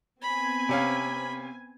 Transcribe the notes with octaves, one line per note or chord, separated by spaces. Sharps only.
B3 C4 G#5 B5
C3 C#4 F5